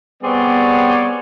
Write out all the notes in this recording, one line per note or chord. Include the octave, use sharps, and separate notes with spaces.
G3 B3 C4 G#4 C#5 D5